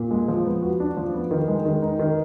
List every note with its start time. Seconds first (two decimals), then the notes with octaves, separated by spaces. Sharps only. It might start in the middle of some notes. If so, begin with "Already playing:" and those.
Already playing: A#2
0.11 G#3
0.28 F3
0.45 B3
0.62 F#4
0.80 D4
0.97 F3
1.14 B3
1.31 D#3
1.48 G#3
1.65 D#3
1.82 D#4
1.99 D#3